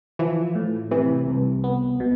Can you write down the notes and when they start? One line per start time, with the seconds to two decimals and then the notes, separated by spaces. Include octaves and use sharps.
0.19 E3 F3
0.55 A2
0.91 C3 E3
1.28 C2
1.64 B3
2.00 B2